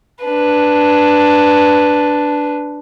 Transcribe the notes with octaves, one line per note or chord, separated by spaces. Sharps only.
D4 B4